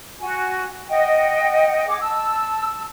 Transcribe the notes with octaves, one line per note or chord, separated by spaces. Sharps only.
F#4 G#5
D#5 F#5 G5
G#4 F#5 D6
A5 E6